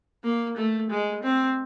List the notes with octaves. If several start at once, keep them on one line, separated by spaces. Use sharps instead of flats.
A#3
A3
G#3
C4